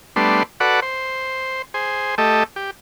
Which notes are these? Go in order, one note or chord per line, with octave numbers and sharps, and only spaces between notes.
G3 A3 B3 D4 C6
F#4 A4 B4 D5 F#5
C5
G#4 C5
A3 G4 A4 D#5
G4